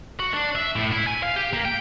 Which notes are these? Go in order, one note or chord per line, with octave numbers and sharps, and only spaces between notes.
F#4
D4
E5
A2
E4
G#5
F5
G4
A#3
G5